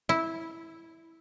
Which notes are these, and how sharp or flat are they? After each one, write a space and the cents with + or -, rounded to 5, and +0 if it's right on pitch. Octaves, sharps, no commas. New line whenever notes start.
E4 -10